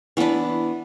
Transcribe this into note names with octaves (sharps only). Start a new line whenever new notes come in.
E3 B3 D4 B4